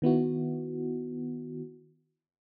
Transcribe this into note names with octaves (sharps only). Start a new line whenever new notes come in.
D#3 B3 E4 F#4